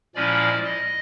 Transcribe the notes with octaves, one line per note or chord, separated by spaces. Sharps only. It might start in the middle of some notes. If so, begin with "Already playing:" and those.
A#2 F3 G#3 C#4 E4 D5
D#5